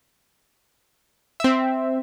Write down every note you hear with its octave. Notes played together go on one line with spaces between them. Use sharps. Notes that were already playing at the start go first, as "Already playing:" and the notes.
C4 E5